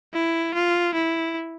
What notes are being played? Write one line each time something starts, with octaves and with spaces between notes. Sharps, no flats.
E4
F4
E4